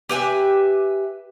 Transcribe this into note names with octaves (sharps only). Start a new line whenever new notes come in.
G4 B4 E5 G#5